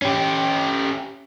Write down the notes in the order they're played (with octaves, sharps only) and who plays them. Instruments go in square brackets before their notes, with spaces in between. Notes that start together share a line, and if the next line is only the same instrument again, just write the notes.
[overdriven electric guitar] C#4 G4